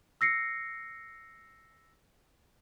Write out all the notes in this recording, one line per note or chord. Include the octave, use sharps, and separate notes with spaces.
E6 A#6 C7 C#7